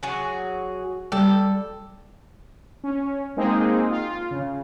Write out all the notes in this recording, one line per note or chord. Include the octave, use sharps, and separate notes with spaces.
F#3 F#4 G#4
G3 A4
C#4
G#3 A#3 C4 D#4 G#4
F4
C#3